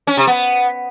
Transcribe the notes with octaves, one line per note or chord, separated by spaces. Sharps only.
C#4
C3
B3